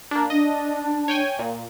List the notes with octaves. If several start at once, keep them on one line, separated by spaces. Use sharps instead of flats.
A#3 D4
D4 D#5
C#5 G5 G#5
A#2